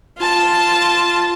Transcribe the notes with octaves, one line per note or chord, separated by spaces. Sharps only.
F4 A5